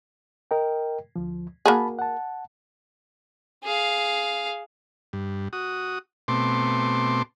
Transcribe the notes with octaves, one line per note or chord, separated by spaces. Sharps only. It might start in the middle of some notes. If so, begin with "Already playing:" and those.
A#4 D#5 G5
D2 F3
A#3 F#4 G#4 A5 B5
F#5 A5
G#4 F5
G2
F#4 D#6
B2 A3 C4 C6 D6